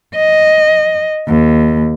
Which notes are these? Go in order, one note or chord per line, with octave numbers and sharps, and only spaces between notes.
D#5
D#2